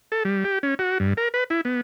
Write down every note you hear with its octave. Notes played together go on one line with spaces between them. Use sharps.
A4
G3
G4
C#4
F#4
G2
A#4
B4
E4
B3